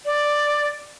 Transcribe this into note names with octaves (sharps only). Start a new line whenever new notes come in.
D5